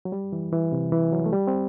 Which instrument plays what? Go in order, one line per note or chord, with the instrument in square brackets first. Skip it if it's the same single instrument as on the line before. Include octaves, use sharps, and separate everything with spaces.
[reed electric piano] F#3
G3
E3
E3
C3
E3
F#3
A3
G3
C4